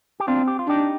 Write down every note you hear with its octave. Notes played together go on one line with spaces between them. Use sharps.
G4
C4 D4 F4
G4
F4
D4 D#4 G4